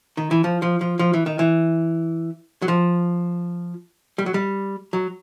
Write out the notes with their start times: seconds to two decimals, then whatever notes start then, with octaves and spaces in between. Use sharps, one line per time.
0.17 D#3
0.31 E3
0.44 F3
0.62 F3
0.81 F3
0.99 F3
1.13 E3
1.26 D#3
1.39 E3
2.62 F#3
2.68 F3
4.18 G3
4.26 F#3
4.34 G3
4.93 F#3